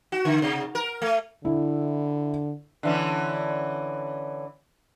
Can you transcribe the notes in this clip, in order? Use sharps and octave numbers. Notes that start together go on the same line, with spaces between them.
F#4
D3
C3
A#4
A3
D3 E4
D3 E3 C#4